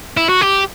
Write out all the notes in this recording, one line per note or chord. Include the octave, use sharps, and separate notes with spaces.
E4
F#4
G4